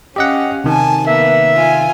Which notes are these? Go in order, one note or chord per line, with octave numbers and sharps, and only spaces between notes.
C#4 G4 D#5 F5 F#5
C3 D#3 G#5 A5
A#3 B3 E5
F4 G#5